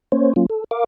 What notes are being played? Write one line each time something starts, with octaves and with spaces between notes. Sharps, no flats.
A#3 C#4 C5 C#5
F#3 A#3 C#4 F4
A4
A#4 F5 D6